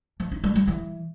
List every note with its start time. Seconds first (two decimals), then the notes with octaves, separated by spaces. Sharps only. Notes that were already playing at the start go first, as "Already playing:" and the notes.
0.20 F3
0.32 D#4
0.44 G3
0.56 G3
0.68 E3